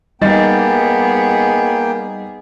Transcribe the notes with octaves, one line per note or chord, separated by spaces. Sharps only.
G3 A#3 B3 D#4 G#4 G5 A6